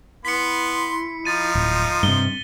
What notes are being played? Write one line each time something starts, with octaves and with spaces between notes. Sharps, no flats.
B3 E4 C6 B6 C#7
F3 D#4 A6 D#7
D1
G2 C3 G7